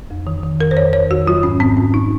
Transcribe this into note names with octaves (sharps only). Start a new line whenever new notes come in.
F2
D#3
D#3
F2 A#4
C5
F2 C#5
D#3 C#5
F2 F#4
F#3 F4
G#2 C#4
G#2 C4
G#2 C#4
D#4